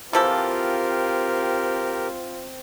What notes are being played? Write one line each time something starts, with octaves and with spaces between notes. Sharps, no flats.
E3 F3 C4 F4 G4 A4 A#4